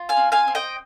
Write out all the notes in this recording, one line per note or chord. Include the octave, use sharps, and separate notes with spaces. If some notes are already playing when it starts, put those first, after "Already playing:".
Already playing: F4
F5 G#5
C4
F5 G#5
C4
D#5 G5